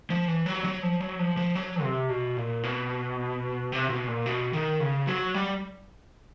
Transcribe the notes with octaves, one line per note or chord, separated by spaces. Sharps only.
F3
E3
F#3
F#3
F3
F#3
F3
F3
F#3
C3
B2
A#2
B2
C3
B2
A#2
B2
D#3
C#3
F#3
G3